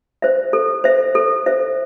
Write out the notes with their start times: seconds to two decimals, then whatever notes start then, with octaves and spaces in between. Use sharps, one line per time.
0.22 C5 E5
0.53 A4
0.84 C5 E5
1.15 A4
1.46 C5 E5